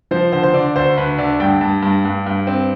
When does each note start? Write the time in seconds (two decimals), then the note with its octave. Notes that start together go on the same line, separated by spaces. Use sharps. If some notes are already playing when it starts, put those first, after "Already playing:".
0.11 F3 C5
0.32 D3 C5
0.43 C5
0.54 D3 D5
0.75 D2 C5
0.97 D2 B4
1.18 D3 D5
1.40 G2 G5
1.61 G2
1.82 G2
2.05 G2
2.26 G2
2.47 C4